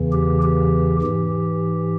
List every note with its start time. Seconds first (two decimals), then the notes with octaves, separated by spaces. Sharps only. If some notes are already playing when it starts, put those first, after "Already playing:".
Already playing: E2 C#3 E3
0.12 G4
0.43 G4
1.02 G#2 E3 G4